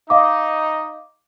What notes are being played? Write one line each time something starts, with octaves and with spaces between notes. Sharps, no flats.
D#4 D#5 F5 D6